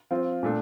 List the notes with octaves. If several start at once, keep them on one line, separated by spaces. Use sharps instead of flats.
F3 C4 F4 F5
A#2 A3 D4